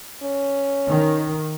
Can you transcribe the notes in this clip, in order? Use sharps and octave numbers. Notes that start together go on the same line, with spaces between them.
C#4
D#3